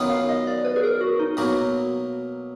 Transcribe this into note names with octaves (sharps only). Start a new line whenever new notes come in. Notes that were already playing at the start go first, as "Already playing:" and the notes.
Already playing: F#2 D#3 F#3 B3 F4
F5
D#5
D5
B4
G#4
A#4
F#4
D#4
B2 F#3 A#3 F#4